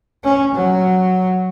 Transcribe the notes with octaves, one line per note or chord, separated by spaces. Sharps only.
C#4
F#3